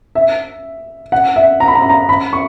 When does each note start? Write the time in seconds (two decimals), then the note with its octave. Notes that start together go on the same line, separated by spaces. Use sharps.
0.15 E5
1.12 F#5
1.36 E5
1.60 A#5
1.68 B5
1.75 A#5
1.82 B5
1.89 A#5
2.09 B5
2.33 C#6